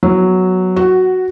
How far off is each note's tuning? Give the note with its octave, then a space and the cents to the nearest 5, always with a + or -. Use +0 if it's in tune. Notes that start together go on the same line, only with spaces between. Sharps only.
F#3 +0 B3 +0
F#4 +0 F#5 +15